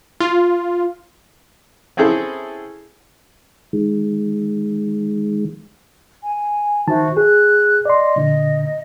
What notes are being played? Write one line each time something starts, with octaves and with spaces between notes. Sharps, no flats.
F4
C4 C#4 E4 G#4 A4
D#3 G#3
G#5
D#3 F#4 C5 E5 A5
G#4 F#6
D5 D#5 C6
A#2 D3